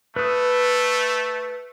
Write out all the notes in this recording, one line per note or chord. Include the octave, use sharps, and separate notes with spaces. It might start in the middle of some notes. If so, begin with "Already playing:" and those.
A3 B4 D#6